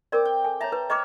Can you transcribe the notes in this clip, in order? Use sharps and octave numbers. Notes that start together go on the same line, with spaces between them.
C4 A#4 D5 D6
G5
A4 G#5
C#5 E5 A5 A#5
B4
A#4 C#5 D#5 D6 E6